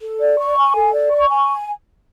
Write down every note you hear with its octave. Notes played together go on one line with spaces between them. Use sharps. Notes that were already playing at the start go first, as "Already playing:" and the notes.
A4
D5
C#6
G#5
A4
D5
C#6
G#5